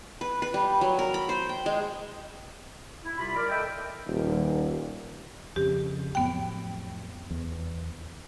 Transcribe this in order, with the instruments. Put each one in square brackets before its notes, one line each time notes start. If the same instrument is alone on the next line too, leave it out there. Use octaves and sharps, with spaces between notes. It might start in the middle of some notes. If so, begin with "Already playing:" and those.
[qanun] B4
B4
G3
F#3
A#4
B5
C5
G5
G#3
[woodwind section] E4
C2 C3 F4 B5
A#4 D5
A4 D#5 E5 G5
[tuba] D#1
[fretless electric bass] F2 C#3 [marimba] G4
[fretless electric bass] F2 A2 F#3 [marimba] B3 G5
[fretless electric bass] E2